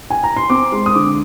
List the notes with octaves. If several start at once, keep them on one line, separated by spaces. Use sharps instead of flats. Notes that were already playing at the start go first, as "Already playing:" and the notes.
G#5
A#5
C6
C4 D6
G#3 C6
D#6
D3 D6